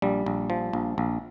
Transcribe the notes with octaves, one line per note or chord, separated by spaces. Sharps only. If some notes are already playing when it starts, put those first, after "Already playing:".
A#1 G3
A#1
F3
A#1
A#1